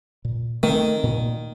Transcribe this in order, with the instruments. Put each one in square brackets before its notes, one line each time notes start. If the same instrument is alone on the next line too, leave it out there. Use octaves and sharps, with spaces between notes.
[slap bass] A#2
[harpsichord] D#3 [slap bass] A3 C4
[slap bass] A#2